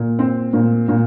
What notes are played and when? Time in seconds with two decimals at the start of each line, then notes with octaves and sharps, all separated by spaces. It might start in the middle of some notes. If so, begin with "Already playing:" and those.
Already playing: A#2
0.19 C4
0.53 A#2
0.88 A#2